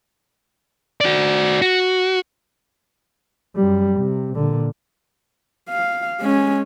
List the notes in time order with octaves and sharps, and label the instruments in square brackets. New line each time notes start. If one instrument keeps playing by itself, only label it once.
[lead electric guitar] F#4 D5
F#4
[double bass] F#2 G3
C3
A#2 D3
[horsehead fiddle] F5
G#3 C#4